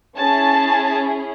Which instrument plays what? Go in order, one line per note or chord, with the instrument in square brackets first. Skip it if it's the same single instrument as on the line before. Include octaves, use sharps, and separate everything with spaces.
[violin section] C#4 E4 G#4 A5